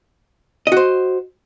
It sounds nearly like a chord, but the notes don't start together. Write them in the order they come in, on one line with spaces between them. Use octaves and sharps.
D#5 F#4 C5